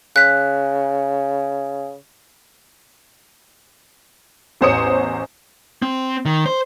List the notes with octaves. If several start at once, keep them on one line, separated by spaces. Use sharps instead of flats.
C#3 F#6 B6
A1 E2 C5 C#5 D#6 C#7
C4
D#3
C5